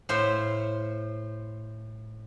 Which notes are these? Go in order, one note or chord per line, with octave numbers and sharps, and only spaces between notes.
A2 C5 E5 F5 C6